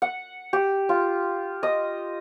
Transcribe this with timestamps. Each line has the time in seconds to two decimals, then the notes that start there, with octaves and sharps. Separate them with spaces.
0.02 F#5
0.53 G4
0.89 F4
1.63 D#5